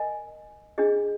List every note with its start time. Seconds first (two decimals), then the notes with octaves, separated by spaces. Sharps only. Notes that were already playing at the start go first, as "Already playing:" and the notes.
Already playing: A#4 D#5 G#5
0.78 D4 G#4 D#5